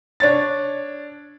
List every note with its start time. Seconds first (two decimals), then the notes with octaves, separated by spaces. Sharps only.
0.20 D4 C#5 A6